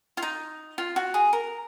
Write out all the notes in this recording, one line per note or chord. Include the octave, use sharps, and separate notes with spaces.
F4
D#4
F4
F#4
G#4
A#4